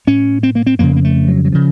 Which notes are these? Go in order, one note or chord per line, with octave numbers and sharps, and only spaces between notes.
A2 C#4
C4
A#3
C4
F2 C#3 A#3
A#3
A3
F#3
F#3
C#3 F3